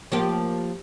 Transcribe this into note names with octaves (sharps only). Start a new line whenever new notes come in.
F3 A#3 G4